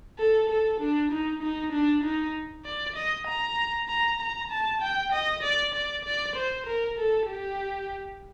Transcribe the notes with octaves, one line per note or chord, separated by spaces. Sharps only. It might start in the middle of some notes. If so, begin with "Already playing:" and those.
A4
A4
D4
D#4
D#4
D4
D#4
D5
D#5
A#5
A#5
A#5
A5
G5
D#5
D5
D5
D5
C5
A#4
A4
G4